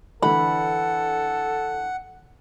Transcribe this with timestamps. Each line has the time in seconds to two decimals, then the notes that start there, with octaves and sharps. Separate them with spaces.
0.22 D3 E3 A4 F#5 B5